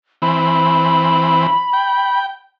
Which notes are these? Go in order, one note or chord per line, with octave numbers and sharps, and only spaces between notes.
E3 C4 B5
G5